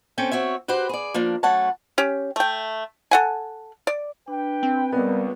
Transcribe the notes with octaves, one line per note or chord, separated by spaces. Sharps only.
C4 C#4 A4 G5
C4 F#4 C#5 E5
F#4 G4 B4 C5
G#4 D5
F3 A#3 D4
F#2 A3 C#5 F#5 A5
C#4 G4
A3 G5
A4 F#5 G#5
D5
D4 B4 G5
C4
C#2 G3 B3 A#4 D5